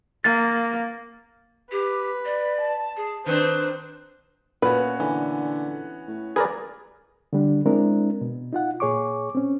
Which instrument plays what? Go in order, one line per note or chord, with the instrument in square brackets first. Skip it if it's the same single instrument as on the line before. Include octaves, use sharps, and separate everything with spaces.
[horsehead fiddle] A#3 [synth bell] A6
[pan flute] G4 [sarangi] B4
[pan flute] D5
[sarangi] A5
[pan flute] G#4
[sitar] D#3 C4 D4 [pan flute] B4 [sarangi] C5
[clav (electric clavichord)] A#2 [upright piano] B3 C#4 F#4 [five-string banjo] B4
[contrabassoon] D3 [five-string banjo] E3
[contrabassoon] A2
[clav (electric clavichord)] G#4 A#4 D5 [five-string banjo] B4
[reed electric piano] D3 G3 D4
G#3 C4 D4 E4 A#4
B2
D#4 F4 F#5
A#2 G#4 C#5 C#6 D6
C4 C#4